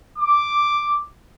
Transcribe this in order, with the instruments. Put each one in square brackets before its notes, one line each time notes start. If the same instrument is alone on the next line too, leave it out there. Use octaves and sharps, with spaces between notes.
[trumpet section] D6